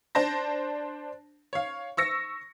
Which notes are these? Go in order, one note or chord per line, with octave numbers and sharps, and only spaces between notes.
D4 C5 A5 A#6
C#5 F5
C#6 E6 A#6 C#7